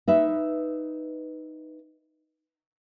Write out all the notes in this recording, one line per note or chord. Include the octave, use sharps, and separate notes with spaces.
D#4 B4 E5